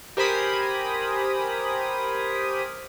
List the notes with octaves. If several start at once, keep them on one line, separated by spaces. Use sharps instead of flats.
G4 A#4 C5 G#5 B5 D#6